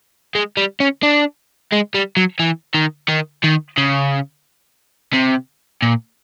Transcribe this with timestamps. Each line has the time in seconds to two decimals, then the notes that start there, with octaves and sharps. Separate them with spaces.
0.35 G#3
0.57 G3
0.80 C#4
1.03 D4
1.72 G#3
1.94 G3
2.17 F#3
2.40 E3
2.75 D#3
3.08 D#3
3.44 D#3
3.77 C#3
5.14 C3
5.82 A#2